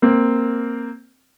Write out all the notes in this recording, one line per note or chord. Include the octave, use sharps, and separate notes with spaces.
A#3 C4